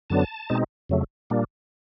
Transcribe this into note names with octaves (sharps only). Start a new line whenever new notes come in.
F#2 D3 F#3 B3 D4 A5
B2 G#3 C4 D#4
F2 C#3 F#3 A3
A#2 G3 A#3 D4